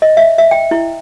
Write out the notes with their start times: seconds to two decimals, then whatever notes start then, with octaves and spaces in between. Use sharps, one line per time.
0.02 D#5
0.17 E5
0.38 E5
0.51 G5
0.71 E4